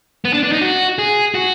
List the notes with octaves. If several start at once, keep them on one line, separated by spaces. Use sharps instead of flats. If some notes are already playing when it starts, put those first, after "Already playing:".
B3
D4
D4
D#4
F#4
G#4
F#4